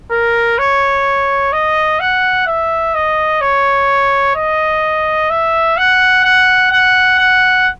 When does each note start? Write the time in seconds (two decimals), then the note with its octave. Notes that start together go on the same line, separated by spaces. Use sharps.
0.11 A#4
0.58 C#5
1.53 D#5
2.00 F#5
2.47 E5
2.95 D#5
3.41 C#5
4.36 D#5
5.30 E5
5.77 F#5
6.24 F#5
6.72 F#5
7.19 F#5